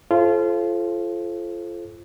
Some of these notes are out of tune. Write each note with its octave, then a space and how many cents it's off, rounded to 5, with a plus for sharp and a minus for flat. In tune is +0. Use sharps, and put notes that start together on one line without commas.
F4 -25 A4 -30 C5 +15